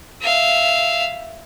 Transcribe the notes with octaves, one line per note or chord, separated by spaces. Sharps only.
E5 F5